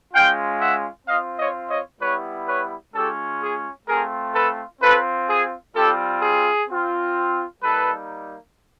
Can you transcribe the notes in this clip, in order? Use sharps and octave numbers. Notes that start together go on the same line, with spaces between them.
G#3 C#4 F4 F5 G5
E5 F#5
C4 F4 D#5 F5
C#5 D#5
C#5 D#5
G3 B3 E4 G4 B4 C#5
B4 C#5
G#3 C#4 F4 G4 A4
G#4
A3 C4 F4 G#4 A#4
A4 B4
C4 F4 A4 B4
G#4
G3 C4 F4 G4 A4
G#4
C4 F4
G3 A#3 D#4 A4 B4